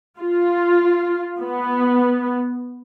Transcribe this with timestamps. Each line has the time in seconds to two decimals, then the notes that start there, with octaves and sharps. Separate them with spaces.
0.19 F4
1.40 B3